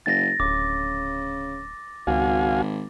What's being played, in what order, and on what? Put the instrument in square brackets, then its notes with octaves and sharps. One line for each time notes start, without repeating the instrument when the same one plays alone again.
[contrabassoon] F#1 [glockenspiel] A6 A#6
[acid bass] D1 [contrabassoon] C#3 [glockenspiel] D6
[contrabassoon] G#1 [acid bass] C#2 [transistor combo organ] F#4 F5 G#5